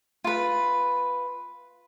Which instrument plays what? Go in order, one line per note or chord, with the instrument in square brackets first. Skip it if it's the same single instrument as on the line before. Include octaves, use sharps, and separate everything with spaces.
[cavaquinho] F4 B4